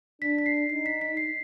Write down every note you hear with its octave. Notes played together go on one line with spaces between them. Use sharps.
D4 B6
B6
C7
D#4 C7
B6
B6
C7